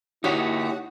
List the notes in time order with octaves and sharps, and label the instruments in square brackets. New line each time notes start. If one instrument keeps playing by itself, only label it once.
[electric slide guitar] D#4 G4 C#5 [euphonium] E4 [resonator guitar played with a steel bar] F#4